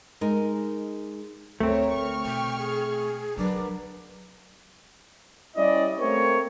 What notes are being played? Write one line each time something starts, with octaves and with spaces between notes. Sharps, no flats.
G#3 D#4 A#4
D2 A3 A#3 C4 A#4 C#5
C#6 F6
B2 G5
G#4
F#3 D4 A#4 B4 F#5
G3 C#4 E4 D5 D#5
A3 A#3 C4 C#5